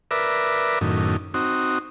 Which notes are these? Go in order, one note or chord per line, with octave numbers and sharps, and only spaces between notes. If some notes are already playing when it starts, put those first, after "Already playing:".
A#4 B4 D5 E5
F#2 A2 D#3
C4 D#4 F#4